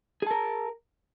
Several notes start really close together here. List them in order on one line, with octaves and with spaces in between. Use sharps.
G#4 A5 A#4